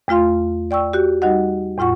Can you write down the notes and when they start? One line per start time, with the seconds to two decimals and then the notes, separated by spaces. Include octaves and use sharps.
0.08 E2 A3 F4 F5 C6
0.71 D5 G5 C#6 E6
0.93 F#4 G4
1.22 G3 D#4 F#4 D#5 F#5
1.78 E2 A2 F4 F#5 C#6